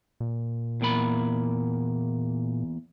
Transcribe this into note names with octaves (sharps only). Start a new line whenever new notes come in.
A#2
E2 A#3 B5